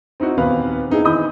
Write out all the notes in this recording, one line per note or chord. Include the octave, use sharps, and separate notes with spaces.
C4 D#4 E4 F#4
D#2 A#2 B3 C4 B4 F5
B3 D#4 E4 G#4
D#3 E3 D#5 B5 D#6 G6